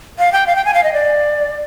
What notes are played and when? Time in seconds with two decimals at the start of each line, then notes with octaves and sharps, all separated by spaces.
0.19 F5
0.32 G5
0.47 F5
0.56 G5
0.65 G#5
0.74 F5
0.84 D#5
0.93 D5